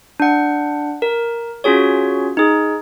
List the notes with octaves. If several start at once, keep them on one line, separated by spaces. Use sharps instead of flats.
D4 F#5
A#4
C#4 F4 F#4 G#4 C#5
D#4 G#4